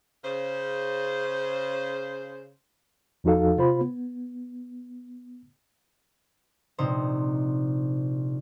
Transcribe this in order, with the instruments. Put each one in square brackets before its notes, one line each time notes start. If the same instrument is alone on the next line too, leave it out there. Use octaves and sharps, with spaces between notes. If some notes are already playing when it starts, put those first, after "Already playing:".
[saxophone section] C#3 C5
[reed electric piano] E2 F3 D#4 F#4 A4 F5
C3 F4 C5 B5
B3
[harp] A#1 C3 D#4 C5